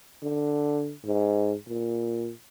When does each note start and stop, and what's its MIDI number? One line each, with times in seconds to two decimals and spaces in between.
0.23 0.93 50
1.05 1.54 44
1.68 2.31 46